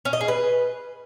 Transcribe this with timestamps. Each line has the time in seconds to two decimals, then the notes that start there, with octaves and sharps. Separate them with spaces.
0.05 C#4
0.13 D#5
0.21 G#4
0.28 B4